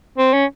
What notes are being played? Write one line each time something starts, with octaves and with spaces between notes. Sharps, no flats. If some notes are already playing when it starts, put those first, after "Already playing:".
C4
C#4